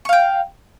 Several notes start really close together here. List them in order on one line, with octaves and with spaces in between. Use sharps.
C#6 F5 G5